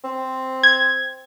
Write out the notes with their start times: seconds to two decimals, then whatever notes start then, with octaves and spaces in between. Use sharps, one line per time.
0.04 C4
0.63 G#6